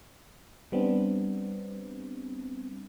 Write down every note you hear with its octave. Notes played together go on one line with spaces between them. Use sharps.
G3 B3 C4 D4